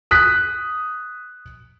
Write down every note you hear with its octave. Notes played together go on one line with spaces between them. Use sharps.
D#6 F#6 B6